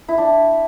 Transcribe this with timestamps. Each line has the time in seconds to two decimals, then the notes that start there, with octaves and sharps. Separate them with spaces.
0.08 E4
0.18 D4